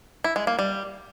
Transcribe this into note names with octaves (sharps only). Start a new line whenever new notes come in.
E4
G#3
A#3
G3